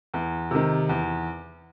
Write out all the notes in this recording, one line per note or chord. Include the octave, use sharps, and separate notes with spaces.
E2
C3 D#3
E2